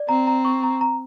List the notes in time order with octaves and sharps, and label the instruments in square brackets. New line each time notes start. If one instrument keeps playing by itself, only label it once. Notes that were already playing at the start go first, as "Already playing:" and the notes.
Already playing: [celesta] D5
[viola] C4 [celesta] A#5
[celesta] A#5
C#6
A#5
A#5